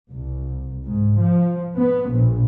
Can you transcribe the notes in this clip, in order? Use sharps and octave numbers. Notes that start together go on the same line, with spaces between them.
C2
G#2
F3
B3
A#1